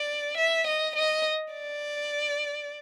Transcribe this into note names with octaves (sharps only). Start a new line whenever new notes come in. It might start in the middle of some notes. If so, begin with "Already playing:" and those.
Already playing: D5
E5
D#5
D#5
D5